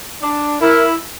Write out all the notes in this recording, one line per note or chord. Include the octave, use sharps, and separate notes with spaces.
D4
E4 A#4